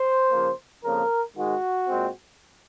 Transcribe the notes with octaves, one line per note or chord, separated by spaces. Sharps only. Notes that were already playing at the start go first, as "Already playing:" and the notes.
Already playing: C5
C#3 F3 A#3
F2 C#3 F3 A#3 A#4
G#2 D#3 G#3 F#4
A#2 G#3 C4